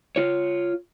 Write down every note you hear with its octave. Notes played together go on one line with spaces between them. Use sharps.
F4 C#5